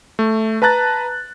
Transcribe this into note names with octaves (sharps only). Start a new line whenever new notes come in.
A3
B4 A5 A#5 F#6 A6